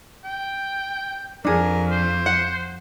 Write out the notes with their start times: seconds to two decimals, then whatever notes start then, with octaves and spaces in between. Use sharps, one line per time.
0.24 G5
1.45 F2 D4 G#4 A#4
1.91 C5
2.26 F#5